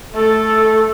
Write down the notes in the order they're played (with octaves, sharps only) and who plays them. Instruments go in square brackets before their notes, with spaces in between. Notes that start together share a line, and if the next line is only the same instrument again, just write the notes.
[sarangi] A3 [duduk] A4